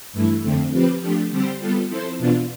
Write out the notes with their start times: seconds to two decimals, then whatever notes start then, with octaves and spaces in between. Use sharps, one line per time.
0.13 G2 E3 A3 E4
0.42 F2 D3 A3 C4
0.71 F3 C4 G4 B4
1.01 F3 A3 D4 G4
1.30 D3 G3 C4 G4 C5
1.60 G3 B3 F4 A4
1.89 F3 C4 E4 A4 C5
2.18 E2 B2 B3 D4 F4